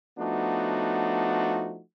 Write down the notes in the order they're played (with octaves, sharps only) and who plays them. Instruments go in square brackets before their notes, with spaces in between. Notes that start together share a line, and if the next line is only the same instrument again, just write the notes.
[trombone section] F3 A3 B3 D4 D#4 F#4